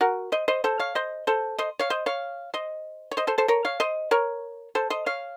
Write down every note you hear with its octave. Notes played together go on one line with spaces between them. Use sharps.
F#4 A#4
C5 D#5
C5 D#5
A4 C5
C#5 F5
C5 D#5
A4 C5
C5 D#5
C#5 F5
C5 D#5
C#5 F5
C5 D#5
C#5
C5 D#5
A4 C5
A4 C5
A#4 C#5
C#5 F5
C5 D#5
A#4 C#5
A4 C5
C5 D#5
C#5 F5